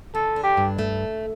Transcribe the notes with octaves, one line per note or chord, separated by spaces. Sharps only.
D3 A4
D4
G4
G2
A3